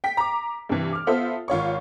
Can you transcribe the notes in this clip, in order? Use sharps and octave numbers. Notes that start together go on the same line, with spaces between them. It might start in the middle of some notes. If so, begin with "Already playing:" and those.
G5 B6
A#5 D6
G2 C3 E3
D6 F6
B3 F4 A4 C5 E5
G#1 F4 C#5 C#6